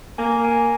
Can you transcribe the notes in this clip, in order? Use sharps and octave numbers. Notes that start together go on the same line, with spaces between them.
A#3 G#5
G#5